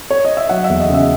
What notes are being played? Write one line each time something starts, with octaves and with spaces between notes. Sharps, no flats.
C#5
D#5
E5
F#3 F#5
E5
E2
D#5
C#3 E5